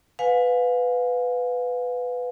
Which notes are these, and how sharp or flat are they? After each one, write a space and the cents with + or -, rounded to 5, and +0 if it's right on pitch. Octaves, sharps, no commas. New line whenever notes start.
B4 +10 F5 +30 G#5 +0